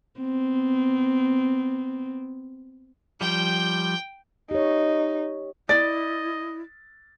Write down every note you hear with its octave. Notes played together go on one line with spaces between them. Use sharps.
B3 C4
F3 G3 G5 G6
D#4 G4 C#5
E4 D5 D#5 A6